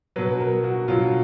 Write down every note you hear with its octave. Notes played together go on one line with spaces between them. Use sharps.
B2 F#3 B4
A#4
F#4
B2 F#3 F4